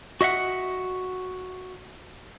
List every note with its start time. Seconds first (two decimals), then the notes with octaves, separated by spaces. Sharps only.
0.21 F#4 D#5 E5 F#5